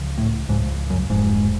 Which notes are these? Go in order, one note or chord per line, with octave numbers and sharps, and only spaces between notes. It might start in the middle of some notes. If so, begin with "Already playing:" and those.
Already playing: C#2 C#3 F3
A2
C#2 G#2 C#3 F3
F#2
F1 F2 G#2 F3 G#3